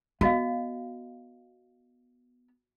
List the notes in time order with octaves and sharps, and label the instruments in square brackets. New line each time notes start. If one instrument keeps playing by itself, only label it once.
[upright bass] B3 [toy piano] F#4 D#5 F5